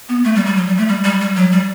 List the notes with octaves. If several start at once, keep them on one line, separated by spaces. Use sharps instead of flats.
B3
A3
G3
G3
F#3
G3
A3
G3
G3
G3
F#3
G3